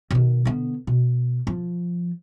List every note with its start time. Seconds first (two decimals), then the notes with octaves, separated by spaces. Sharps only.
0.11 B2 D#3
0.45 D3 B3
0.87 B2
1.47 F3